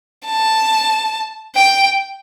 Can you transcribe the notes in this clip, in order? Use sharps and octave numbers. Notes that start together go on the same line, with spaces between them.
A5
G5